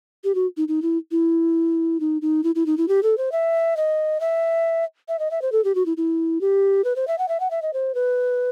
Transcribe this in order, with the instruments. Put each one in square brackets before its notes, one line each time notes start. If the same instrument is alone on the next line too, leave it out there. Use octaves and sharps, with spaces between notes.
[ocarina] G4
F#4
D#4
D#4
E4
E4
D#4
D#4
E4
E4
D#4
E4
G4
A4
C5
E5
D#5
E5
E5
D#5
E5
C5
A4
G4
F#4
E4
E4
G4
B4
C5
E5
F#5
E5
F#5
E5
D#5
C5
B4